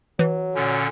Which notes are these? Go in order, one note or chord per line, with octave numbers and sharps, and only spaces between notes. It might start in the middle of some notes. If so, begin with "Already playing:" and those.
E3 F#3
A#2 D3 C#4